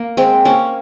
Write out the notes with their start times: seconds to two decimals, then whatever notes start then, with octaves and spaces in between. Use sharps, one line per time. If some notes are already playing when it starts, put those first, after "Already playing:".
Already playing: A#3
0.17 G#3 C4
0.45 A#3 C#4